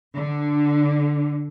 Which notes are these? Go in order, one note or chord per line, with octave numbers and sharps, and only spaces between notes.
D3